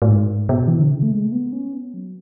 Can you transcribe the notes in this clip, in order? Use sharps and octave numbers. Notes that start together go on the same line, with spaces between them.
A2
G#2
B2
E3
D3
C#3
A3
G#3
A3
B3
C#4
B3
F#3